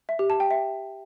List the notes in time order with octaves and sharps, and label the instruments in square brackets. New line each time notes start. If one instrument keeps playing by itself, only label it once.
[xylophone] E5
G4
A5
G5
E5